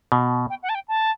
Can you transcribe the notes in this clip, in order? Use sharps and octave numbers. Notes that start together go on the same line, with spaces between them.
B2
G5
F#5
A5
G5
A5